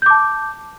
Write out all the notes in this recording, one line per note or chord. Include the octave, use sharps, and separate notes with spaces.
A5 D6 G6